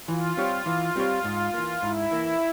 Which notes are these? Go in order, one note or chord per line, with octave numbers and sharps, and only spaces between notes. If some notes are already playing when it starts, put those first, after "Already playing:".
E3 F4
G3 C4 G4 C#5
E3
G3 C4 G4 C#5
G#2
E3 A#3
G#2 E4
E3 A#3